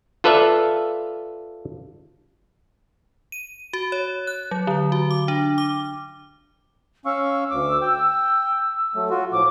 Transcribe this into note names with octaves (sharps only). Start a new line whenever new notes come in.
F4 A4 B4 D5 E5 F5
D#7
F#4
C#5
F#6
F#3
D3
F#4
D6
D4
D6
C#4 F5 C#6 E6
D2 D6
G5
F#3 A3
F4 F#4
A2 F3 D6